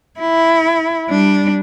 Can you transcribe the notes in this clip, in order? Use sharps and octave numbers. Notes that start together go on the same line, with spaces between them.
E4
G3 D4